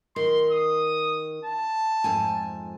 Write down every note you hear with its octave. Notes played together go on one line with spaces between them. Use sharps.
D#3 C6
D#6
A5
F2 G#2 G#5